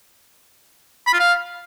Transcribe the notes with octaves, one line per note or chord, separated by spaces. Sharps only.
B5
F4
F5